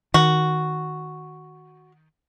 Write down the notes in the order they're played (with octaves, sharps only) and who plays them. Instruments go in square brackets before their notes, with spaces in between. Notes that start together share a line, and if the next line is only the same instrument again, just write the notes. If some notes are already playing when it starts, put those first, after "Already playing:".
[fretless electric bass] D#3 [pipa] F#4